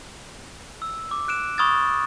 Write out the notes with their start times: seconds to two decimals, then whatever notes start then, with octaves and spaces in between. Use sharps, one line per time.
0.82 E6
1.11 D6
1.28 F#6 D7 E7
1.58 B5 C#6 D#6 F6 G#6 A6